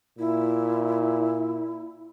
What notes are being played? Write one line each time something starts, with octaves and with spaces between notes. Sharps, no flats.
A#2 E4